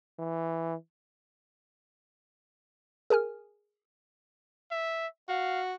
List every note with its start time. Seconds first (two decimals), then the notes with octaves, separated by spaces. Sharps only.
0.19 E3
3.10 G#4 A#4 G#5 F6
4.71 E5
5.29 F#4 F5